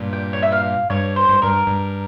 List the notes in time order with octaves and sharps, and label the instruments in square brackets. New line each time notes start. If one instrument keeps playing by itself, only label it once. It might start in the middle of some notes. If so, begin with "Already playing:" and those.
Already playing: [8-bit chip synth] G2 A#2
[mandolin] G5
C#5
E5
F5
[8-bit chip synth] G2 [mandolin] C#5
[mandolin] C5
[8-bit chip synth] G2
[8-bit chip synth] G2 [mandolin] A#4
[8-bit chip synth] G2